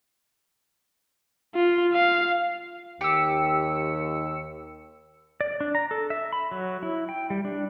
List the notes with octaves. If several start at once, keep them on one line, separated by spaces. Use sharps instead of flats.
F4
F5
D#2 G4 E6 C#7
D5
D4
A#5
A4
E5
B5
F#3
E4
G5
G3
D4